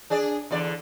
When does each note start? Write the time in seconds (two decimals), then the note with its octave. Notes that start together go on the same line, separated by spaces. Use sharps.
0.10 D4 G#4 D5
0.51 E2 D3 D5